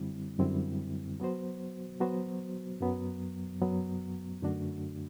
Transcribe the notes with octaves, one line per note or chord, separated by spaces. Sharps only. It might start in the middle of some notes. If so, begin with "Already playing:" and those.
Already playing: F#2 D3 G3 C4 E4
F#2 D3 G3 C4 E4
F#3 B3 F#4 C5
F#3 B3 F#4 C5
F#2 F#3 B3
F#2 F#3 B3
F#2 D3 A3 D4 F#4